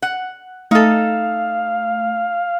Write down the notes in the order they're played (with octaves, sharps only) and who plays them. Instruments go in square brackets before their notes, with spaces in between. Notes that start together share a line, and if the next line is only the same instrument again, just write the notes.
[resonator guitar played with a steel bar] F#5
[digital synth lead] A3 [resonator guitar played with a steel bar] D#4 A4 [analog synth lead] F5